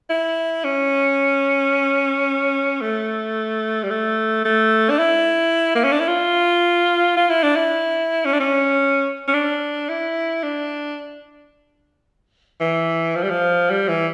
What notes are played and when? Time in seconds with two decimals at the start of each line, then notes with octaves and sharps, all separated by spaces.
0.10 E4
0.64 C#4
2.81 A3
3.83 G3
3.90 A3
4.45 A3
4.90 D4
4.99 E4
5.75 A#3
5.84 C#4
5.92 D4
6.00 E4
6.08 F4
7.17 F4
7.30 E4
7.43 D4
7.56 E4
8.25 C#4
8.33 D4
8.40 C#4
9.28 C#4
9.34 D4
9.89 E4
10.43 D4
12.60 E3
13.15 F3
13.23 G3
13.30 F3
13.70 G3
13.88 E3